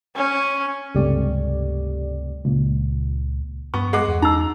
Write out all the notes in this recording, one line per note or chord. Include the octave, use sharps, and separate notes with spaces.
C#4
C#2 G2 C3 A3 G4 D5
C#2 A#2
G2 B3 C#6
G#3 F#5 D6
E2
D#4 A#5 E6